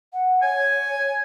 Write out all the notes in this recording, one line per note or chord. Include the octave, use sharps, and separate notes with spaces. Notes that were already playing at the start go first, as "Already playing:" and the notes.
F#5
C#5 G#5